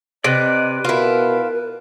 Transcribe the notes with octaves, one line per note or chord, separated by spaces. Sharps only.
C3 B4 D5 D#5
B2 E4 F4 A#4